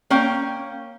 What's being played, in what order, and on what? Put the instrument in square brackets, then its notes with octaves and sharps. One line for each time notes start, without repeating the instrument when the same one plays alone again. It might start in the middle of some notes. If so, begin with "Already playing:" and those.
[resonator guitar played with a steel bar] A#3 C#4 G5